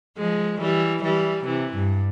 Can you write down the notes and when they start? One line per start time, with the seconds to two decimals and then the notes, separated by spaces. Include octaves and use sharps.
0.17 F3 G#3
0.60 E3 G3
1.02 E3 G3
1.45 C3 E3
1.74 G2